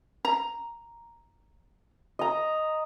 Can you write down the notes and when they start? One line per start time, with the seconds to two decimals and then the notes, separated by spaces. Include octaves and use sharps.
0.25 A#5
2.19 D#5 A#5